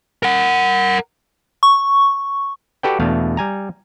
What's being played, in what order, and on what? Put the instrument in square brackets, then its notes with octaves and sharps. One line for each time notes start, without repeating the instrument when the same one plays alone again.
[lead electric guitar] A#4 F#5
[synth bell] C#6
[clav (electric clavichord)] F#4 G4 A4 B4 D5 G5
E2 B2 A3 D4 F5
G3 G#5 A#5